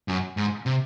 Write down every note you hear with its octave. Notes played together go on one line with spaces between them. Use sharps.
F#2
G#2
C3